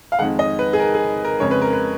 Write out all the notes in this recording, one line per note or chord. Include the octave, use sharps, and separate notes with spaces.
F5
F2 D#3 G#3 F#5
D#5
B4
G#4
A#4
G#4
A#4
F2 C#3 G#3 C#5
B4
A#4
B4